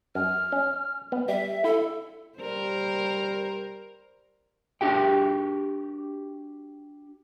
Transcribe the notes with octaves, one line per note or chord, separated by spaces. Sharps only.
F#2 F6
C#4
B3
G3 E5
E4 A4
G3 A#4 C5
D4 F#4 G4 G5